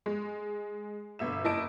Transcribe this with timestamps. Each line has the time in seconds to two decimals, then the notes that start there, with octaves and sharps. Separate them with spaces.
0.06 G#3
1.19 G1 B2 E5 E7
1.44 F#1 E4 D#5 A5 D7